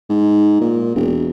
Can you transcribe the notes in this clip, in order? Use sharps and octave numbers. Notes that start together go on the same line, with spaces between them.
G#2
A#2
E1